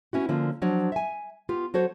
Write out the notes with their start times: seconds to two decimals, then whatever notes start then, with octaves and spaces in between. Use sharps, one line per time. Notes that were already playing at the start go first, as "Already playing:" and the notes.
0.13 B3 C#4 E4 F#4
0.29 D3 F3 A#3 C#4 D4 F4
0.62 F3 F#3 D4 C#5
0.92 E5 G#5
1.49 B3 F4 G4
1.74 F#3 F#4 A4 C5 C#5